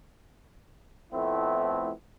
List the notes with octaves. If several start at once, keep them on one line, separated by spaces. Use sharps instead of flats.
F2 A2 A3 B3 C4 E4